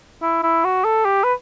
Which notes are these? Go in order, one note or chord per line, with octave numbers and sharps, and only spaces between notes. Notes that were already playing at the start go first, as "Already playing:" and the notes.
E4
E4
F#4
A4
G4
B4